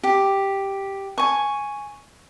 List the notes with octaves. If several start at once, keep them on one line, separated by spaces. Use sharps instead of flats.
G4
G#5 C#6